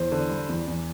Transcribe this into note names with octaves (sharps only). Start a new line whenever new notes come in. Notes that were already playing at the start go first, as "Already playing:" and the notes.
Already playing: E2 C5
D3
G3
E2
E2